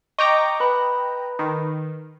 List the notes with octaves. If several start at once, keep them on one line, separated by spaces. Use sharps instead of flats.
D#5 G5 A#5 C#6 D6 A#6
B4 B5
D#3